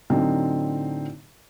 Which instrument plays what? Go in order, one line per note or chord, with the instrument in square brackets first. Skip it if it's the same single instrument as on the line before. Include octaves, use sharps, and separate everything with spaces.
[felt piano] A2 D3 F#3 C4 D#4